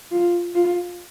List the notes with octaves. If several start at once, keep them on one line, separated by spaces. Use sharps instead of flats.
F4
F4